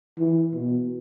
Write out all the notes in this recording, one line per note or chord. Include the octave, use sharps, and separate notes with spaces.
E3
B2